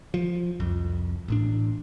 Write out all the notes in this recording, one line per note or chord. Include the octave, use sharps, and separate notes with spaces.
F3
C2 F2
A1 A2 D4